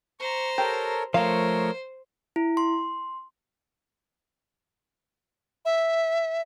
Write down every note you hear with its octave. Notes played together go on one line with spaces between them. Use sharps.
C5 A#5 C#6
G4 A4 A#4 C#5
F3 A3 A#4 C5 C#5 F5
E4
C6
E5